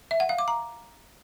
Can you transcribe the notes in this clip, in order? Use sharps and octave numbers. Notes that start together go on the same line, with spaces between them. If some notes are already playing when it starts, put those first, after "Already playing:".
E5
F#5
F5
D6
A#5